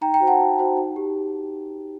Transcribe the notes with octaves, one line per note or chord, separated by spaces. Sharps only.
D#4 G5 A#5
G5 A#5
F#4 C5
F#5 A5
D#4
F#4 C5
D#4
G4